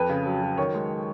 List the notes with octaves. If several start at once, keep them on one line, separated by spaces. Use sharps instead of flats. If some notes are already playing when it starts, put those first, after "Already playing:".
Already playing: F2 B4
C#3
F#3
F#3
D#3 C#5
G#3